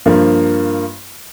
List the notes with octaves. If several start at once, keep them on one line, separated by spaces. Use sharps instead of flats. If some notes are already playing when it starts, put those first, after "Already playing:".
G2 F3 A#3